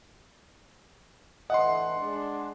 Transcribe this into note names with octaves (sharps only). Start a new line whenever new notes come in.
A2 D3 E3 D#5 F#5 C6
G#3 D4